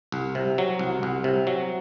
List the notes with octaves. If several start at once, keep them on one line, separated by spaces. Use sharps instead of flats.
C2
C3
F#3
C2
C2
C3
F#3